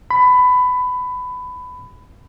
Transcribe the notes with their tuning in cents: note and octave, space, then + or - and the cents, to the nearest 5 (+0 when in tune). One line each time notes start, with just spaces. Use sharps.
B5 +20